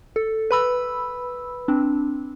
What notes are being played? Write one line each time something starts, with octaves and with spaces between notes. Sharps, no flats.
A4
B4 B5 E6
C4 D4